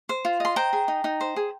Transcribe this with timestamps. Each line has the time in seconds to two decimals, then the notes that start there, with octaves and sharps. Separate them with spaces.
0.09 C5
0.25 F4
0.40 D#5 C6
0.56 C5 G5 A#5
0.73 G#4
0.88 D#4
1.04 D#4
1.21 C5
1.36 G#4